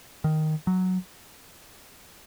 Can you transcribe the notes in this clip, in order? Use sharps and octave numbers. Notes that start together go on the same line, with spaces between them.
D#3
F#3